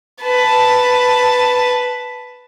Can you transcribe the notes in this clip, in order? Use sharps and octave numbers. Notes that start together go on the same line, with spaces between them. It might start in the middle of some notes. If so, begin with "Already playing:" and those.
B4 A5